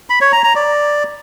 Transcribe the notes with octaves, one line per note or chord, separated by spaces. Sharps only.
B5
C#5
A#5
A#5
D5